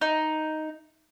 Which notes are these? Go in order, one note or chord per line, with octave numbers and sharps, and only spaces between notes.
D#4